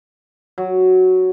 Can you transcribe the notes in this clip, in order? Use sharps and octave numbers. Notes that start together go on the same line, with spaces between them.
F#3